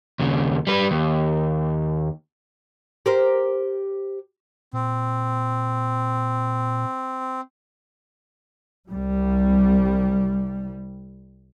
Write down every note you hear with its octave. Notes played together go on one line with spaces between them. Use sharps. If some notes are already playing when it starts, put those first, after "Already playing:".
D#2 C#3
G3 B4
D#2
G4 A#4 C5
A#2 C4
C2 G3